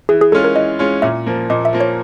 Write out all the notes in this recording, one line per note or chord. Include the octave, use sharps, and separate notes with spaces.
E3 G#4
G#4
G#3 C#4 F4 A4
A#4
E3 D#5
G#3 C#4 F4
A#2 E5
F3 A#3
A#2 D#5
E5
F3 A#3
C#5